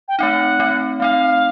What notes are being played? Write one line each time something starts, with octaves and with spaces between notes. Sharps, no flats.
G5
A3 C4 D#4 F#5
A3 C4 D#4
A3 C4 D#4 F5